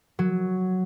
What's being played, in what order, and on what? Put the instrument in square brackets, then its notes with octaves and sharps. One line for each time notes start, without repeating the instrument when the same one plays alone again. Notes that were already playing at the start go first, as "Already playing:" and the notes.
[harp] F#3